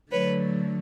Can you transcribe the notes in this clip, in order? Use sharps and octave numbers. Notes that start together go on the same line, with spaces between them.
D3 F#3 A3 B4 C#5